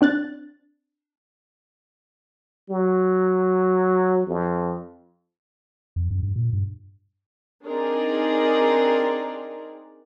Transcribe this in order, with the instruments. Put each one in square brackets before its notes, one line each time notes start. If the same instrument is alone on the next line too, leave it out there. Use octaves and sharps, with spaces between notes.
[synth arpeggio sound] C4 D4 F#6 A6
[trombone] F#3
F2
[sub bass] F2
F#2
G2
A#2
G2
[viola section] C4 D4 D#4 G#4 A#4 D5